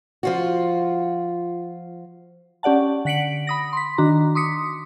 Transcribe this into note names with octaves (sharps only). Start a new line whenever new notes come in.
F3 F4 F#4
C#4 G4 D5 F#5 A5
D3 F#5 B6 C#7 D7 F#7
B5 D#6 A#6
C6 B6
D#3 D4 F#4 A#5
C6 D6 D#6 B6 C#7